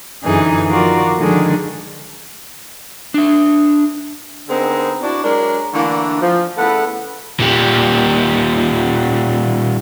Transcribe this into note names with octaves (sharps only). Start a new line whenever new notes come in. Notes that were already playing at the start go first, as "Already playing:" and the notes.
F#2 D3 E3 D#4 G#4
D#3 F3 F4 F#4 A#4 D5
D3 D#3 F3 G#3 D4 G#4
D4 E5
D3 B3 C4 D#4 G#4 A#4
D4 E4 F#4 D5
F#3 G#3 D4 A#4
D3 E3 A3 A#3 D4
F3
C#3 A3 B3 E4 A4 F#5
A#2 G3